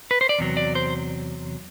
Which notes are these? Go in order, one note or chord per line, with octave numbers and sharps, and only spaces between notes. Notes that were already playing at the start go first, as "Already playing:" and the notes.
B4
C5
D5
E2 C3 F#3
D5
C5